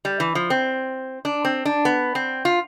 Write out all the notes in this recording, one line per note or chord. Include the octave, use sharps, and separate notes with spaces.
G3
E3
F3
C4
D4
C4
D4
B3
C4
F4